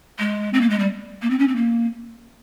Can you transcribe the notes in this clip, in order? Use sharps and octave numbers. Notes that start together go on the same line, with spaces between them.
G#3
C4
A#3
G#3
G3
A#3
C4
C#4
C4
A#3